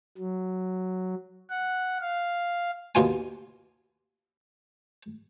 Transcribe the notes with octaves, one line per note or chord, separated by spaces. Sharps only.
F#3
F#5
F5
D#2 B2 F4 G#5